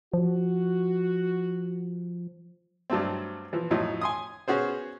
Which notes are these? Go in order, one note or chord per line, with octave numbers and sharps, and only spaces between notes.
F3 F#4
G2 F#3 A3 C4
E3 F3
F2 A2 F3 F#3 D#4
G#5 C6 D#6
B3 C#4 F#4 G#4 C5